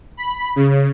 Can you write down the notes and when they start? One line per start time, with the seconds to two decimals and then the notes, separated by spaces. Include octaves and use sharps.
0.17 B5
0.56 C#3